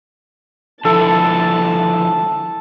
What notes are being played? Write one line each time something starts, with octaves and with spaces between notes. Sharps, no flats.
D3 F3 E4 A4 A5